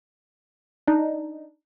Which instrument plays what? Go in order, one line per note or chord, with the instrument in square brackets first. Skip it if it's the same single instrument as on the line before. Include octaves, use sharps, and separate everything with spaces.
[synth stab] D4 D#4